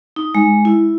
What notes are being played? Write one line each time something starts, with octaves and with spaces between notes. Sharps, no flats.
D#4
G#3
E4